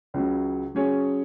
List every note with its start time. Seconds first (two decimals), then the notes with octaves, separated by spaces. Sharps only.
0.14 C#2 C#3 F#3
0.75 F#3 C#4 G#4 C#5